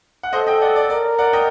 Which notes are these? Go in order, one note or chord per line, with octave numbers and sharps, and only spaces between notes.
F#5
A4 C5 D#5
D#5 G5
D5 F#5
D5
A#4 D5
D5 F#5
D#5 G5